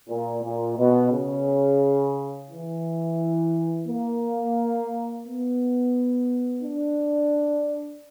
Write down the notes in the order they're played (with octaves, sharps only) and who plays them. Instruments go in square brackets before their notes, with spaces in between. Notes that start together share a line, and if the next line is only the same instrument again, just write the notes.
[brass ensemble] A#2
A#2
B2
C#3
E3
A#3
B3
D4